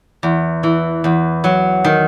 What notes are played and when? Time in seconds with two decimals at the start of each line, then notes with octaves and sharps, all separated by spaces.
0.23 E2
0.63 E3
1.04 E2
1.44 F#3
1.84 D#3